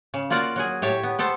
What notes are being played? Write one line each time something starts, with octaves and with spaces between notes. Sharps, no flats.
C#3
A#3 F4 F#4 D5 F#5
F#3 F#4 G#4
A2 G4 C#5 A5
B3
B3 A4 C5